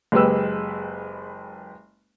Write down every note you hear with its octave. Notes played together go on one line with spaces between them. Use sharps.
F#1 G#3 G4 B4 E6